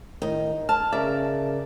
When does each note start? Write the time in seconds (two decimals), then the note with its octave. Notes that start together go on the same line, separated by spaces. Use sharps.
0.22 A2 D#3 D#4
0.69 A5 F6
0.93 C#3 A#4 D5 E5